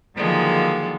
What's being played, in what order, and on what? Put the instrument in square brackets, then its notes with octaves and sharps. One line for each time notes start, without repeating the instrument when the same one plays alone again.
[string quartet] D3 D#3 F3 F#3 G#3 A#3